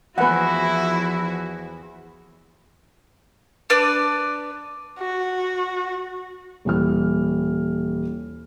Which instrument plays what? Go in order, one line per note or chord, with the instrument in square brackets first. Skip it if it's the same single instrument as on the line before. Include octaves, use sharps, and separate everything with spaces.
[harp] E2 B3 [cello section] F3 F#4 [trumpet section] E4 [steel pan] B4 F#5
[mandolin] D4 B4 D5
[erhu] F#4
[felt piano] D#1 E3 F6